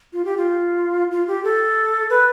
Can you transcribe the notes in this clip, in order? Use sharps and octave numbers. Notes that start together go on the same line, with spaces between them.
F4
G4
F4
F4
G4
A4
B4